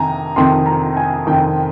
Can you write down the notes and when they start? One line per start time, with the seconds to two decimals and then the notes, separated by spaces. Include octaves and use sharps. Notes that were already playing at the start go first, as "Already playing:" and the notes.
Already playing: F2 C3 D#3 G#5 A#5
0.36 F2 C3 D#3 C6
0.66 A#5
0.97 G#5
1.27 F2 C3 D#3 G5